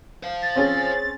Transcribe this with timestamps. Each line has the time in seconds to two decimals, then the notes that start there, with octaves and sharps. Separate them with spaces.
0.23 C5 F5
0.42 A6
0.56 C4 C#4 G#4